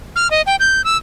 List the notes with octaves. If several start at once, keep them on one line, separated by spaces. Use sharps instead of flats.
F6
D#5
G5
G6
E6